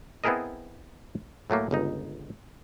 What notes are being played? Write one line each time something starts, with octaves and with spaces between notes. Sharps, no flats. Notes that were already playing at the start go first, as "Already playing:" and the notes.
B3 C4 E4 G#4 A#4 D#5
A2 F#3 A3 A#3
G1 C#2 D#4